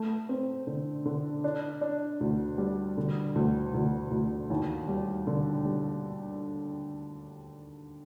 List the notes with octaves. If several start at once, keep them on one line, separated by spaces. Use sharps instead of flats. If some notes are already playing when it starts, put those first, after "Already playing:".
Already playing: A3
C4
D3
D3
D4
D4
D2
G3
D3
D2
D2
D2
D#2
G3
D3
G3